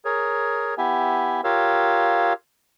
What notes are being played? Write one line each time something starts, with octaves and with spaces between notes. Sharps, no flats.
G#4 A#4 C#5
B3 E4 G4 E5 G#5
F4 G4 A#4 C#5 F5 E6